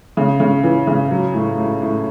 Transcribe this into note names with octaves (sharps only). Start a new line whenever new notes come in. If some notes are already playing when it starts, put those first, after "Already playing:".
C#3
C#3
E3
C#3
F#3
A2
A2
A2